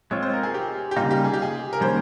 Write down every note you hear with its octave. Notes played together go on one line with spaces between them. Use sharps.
G#3 C4 F4 C#5
C5
A#4
G#4
G4
G4
C#3 G3 A#3 D#4 F4
G4
G#4
G4
G#4
A#4
D#3 G3 A#3 C#4 C5